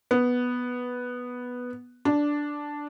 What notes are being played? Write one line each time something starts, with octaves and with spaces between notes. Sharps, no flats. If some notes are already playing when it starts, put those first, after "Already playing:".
B3
D4